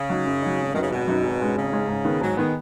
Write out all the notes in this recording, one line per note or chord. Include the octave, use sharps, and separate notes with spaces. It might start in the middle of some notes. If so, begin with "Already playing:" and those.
Already playing: C#3
F#3 D#4
F#2
F#3 D#4
G#1
F#2 D#3 F#3 D#4 B4
C#3
G#1 B2
F#2 F#3 D#4 B4
G#1
G#2 G#3 C#4
G#1 C#3
G#2 G#3 C#4
G#2
D#3 B3
G#2 F#3
D#3 G#3 B3